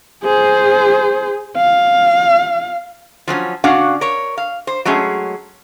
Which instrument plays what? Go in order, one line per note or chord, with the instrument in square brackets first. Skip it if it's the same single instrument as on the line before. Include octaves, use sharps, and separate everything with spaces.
[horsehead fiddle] G#4 C5
F5
[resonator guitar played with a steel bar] F3 F#3 C4 C#4
C#3 C#4 D4 F#4 F5 F#5
A#4 C#5
F5
C5
F#3 G#3 A3 C#4 G#4